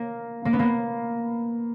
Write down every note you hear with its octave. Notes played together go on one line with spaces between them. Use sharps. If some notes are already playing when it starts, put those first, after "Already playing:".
Already playing: A#3
A#3
B3
A#3